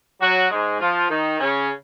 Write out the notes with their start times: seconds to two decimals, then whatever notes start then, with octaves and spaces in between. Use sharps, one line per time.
0.22 F#3 F#4
0.51 G#2 G#3
0.80 F3 F4
1.10 D#3 D#4
1.40 C#3 C#4